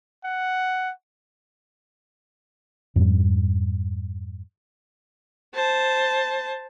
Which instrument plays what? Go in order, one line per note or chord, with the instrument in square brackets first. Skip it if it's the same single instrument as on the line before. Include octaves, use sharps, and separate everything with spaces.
[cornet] F#5
[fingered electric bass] F2 G#2 G3
[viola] C5 A5